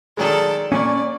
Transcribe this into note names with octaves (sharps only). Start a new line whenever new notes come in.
D#3 F#3 G#3 A4 D5
A#2 C#4 D5 C#6